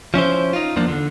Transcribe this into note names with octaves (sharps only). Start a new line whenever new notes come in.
F3 C#4 E4 C5
D#4 F4
E2 F3 A#3 D4
D3